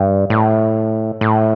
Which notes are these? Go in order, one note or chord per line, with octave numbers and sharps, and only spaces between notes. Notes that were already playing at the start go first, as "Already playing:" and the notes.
Already playing: G2
A2
A2